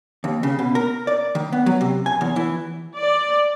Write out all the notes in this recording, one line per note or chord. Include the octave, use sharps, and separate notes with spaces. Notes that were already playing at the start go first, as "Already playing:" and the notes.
D#2
C#3
B2
A#4
D5
D#3
B3
F#3
C3
G#5
E2
E3
D5